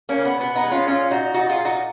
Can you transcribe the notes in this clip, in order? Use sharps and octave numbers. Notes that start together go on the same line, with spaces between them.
A#3 C#4
C#3
B3
B2 B3
B3 D#4
G#3
C#4 F4
A#2 C#4 F4
A#2 D#4 F#4
A#2 D#4 F#4
F4 G#4
A#2
D#4 F#4